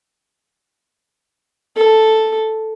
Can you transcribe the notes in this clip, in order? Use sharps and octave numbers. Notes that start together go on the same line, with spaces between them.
A4